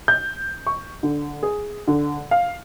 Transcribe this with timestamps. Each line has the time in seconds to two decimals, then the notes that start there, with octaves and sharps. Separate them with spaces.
0.08 G6
0.67 C#6
1.03 D3
1.43 G#4
1.88 D3
2.31 F5